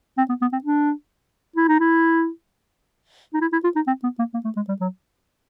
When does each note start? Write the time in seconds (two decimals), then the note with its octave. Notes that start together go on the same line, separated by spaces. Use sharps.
0.18 C4
0.29 B3
0.41 B3
0.52 C4
0.64 D4
1.56 E4
1.68 D#4
1.80 E4
3.34 D#4
3.41 E4
3.52 E4
3.64 F4
3.76 D#4
3.87 C4
4.04 B3
4.19 A#3
4.34 A#3
4.45 A3
4.56 G#3
4.68 G3
4.80 F#3